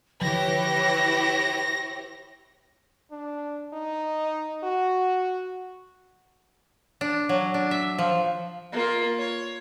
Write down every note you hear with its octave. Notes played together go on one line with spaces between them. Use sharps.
D3 E3 F3 E4 G4 B4 C#5 A#6
D4
D#4
F#4
D4
F#3
D4
E5
F3
A#3 F4
C#5